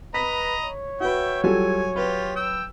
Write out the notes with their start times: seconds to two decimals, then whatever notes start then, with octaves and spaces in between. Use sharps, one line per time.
0.14 B4 D#5 A#5 B5 B6
0.64 C#5
1.00 F#4 B4 E5 G5
1.44 F#3 G3 F4 A4 G#5
1.96 F4 G4 B4
2.36 G5 E6